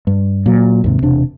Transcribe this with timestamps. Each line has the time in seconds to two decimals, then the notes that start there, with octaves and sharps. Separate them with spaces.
0.07 G2
0.46 A#2 F#3
0.84 D#2 G#2 C3
1.02 E1 C3 D4